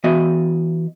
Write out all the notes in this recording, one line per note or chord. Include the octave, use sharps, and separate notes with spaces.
E3 B3 F#4 D#5 E5